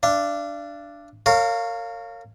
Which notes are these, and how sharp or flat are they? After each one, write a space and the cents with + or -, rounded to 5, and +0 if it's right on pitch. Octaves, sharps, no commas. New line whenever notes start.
D4 +0 F5 -40
A#4 -35 C#5 +0 F5 +0